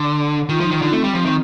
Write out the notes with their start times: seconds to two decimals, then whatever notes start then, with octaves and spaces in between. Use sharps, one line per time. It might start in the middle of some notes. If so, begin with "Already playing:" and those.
Already playing: D3
0.49 D#3 F4
0.60 F3 D#4
0.71 D#3
0.82 D3
0.92 A3 C4
1.04 G3
1.14 F3
1.25 D#3